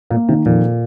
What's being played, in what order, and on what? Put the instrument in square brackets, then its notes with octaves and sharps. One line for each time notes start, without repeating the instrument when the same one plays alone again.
[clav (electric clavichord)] A#2 [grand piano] A#3
[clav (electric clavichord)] C3 [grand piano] D#3
[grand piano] F2 [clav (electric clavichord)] A#2